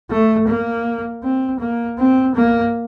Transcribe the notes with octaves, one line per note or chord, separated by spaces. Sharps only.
A3
A#3
C4
A#3
C4
A#3